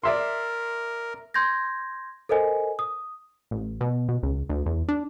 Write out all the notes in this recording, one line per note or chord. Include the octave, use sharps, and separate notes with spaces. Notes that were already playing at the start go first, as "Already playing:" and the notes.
A#4 D5 E5 C6
C6 G6 G#6 A#6
A4 A#4 C5 D#5 G#5
D#6
A1
B2
B2
C#2
D2
E2
D4